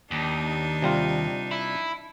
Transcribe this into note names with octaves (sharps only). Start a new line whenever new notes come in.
D#2 D4 D#4
C3 G3 F4
E4